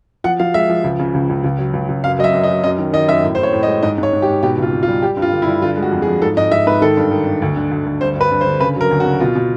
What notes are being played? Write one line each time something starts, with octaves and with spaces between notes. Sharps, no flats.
F3 F#5
F3 F5
G#3 E5
F3
C#2
C#3
C#2
C#2
C#2
F#3
C#2
C#2
F#2 F5
F#3 D#5
E5
F#2
D#5
F#3
F#2 D#5
D#3
D#3 D#5
F#2 E5
A2
C5
A2
C#5
A2
D#5
G#3
G#2 D#5
G#2
C#5
G#2
G4
G#2
B2 G4
C#2 F4
B2
F4
G3
G3 G4
G2
F4
D3
E4
G2
D3 F4
G#3
F#4
F2
G#4
F3
G#2 A4
G#2 D#5
G#2 E5
G#2 B4
D#3 A4
G2
D#3
G2
D2
D3
D2
D2
G2 C5
G2 B4
G2
C5
D3
C#3 B4
F#3 A#4
D2
F#4
C#3
B2 F4
B2